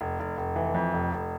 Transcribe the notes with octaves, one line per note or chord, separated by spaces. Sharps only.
F1
F1
F1
E3
F2
F1
F1